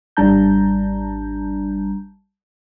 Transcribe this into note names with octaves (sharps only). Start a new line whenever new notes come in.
G#1 G3 D4 A5 A#5 G6